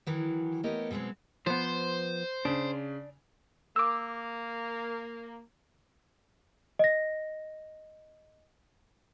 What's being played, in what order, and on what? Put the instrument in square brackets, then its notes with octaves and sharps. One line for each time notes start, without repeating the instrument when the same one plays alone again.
[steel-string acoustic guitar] D#3 E3 F#3
A3 B3 G4 A#4 C#5 D#5
B2 F#3 G#3 B3 C4
[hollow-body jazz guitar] F3 B3 [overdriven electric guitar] C5
[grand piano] C#3 [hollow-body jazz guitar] D4
[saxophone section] A#3 [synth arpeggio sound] D6 E6
[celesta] D#5 A#6